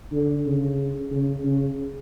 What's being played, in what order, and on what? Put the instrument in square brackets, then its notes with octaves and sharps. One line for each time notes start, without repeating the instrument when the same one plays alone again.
[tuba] D3
C#3
C#3
C#3